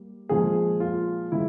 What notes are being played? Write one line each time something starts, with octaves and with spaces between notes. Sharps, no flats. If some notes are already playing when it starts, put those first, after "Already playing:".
Already playing: G3 A#3
A#2 F3 G#3 G#4
F4
E3 G#3 E4